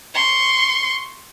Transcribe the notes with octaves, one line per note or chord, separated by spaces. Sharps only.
C6 C#6